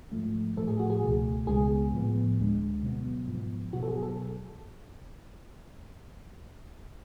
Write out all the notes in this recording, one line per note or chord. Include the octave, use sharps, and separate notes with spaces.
G#2 F3 A3
A2 F3 A3 A4
G#4
F#4
G#4
C#2 B2 A3
C#2 C#3 G#3 B3 G#4
A2 F3 B3
D2 D3 G#3
B2 F#3 B3
G#2 F3 B3
B2 F#3 B3 F#4
A4
G#4
A4